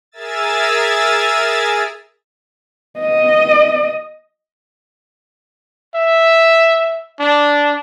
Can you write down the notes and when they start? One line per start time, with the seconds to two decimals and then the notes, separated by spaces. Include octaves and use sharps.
0.12 G#4 A#4 E5 G#5 E6 A6
3.00 D#5
5.95 E5
7.19 D4